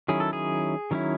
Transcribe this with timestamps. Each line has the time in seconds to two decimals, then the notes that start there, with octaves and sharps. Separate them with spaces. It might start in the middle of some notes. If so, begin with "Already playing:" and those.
0.08 D#3 F#3 C#4 E4 G#4
0.20 A4
0.33 G#4
0.91 D#3 F#3 C#4 E4